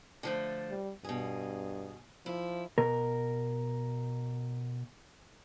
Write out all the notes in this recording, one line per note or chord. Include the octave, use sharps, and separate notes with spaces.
D3 F3 A3
G3
G2 B2 G#4
F3 E4
B2 A#4